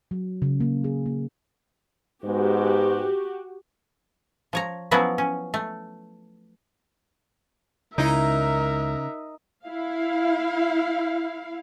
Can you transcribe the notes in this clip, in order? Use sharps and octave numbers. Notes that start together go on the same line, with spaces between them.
F#3
C#3
A#3
G#4
A#3
G#2 G#3 B3 F#4 G4
F3 C#5 A#5
F3 F#3 B3 C#4 E4 F#4
C#4
A3
C#2 C#3 D#4 E4 A#4 E5
E4 F5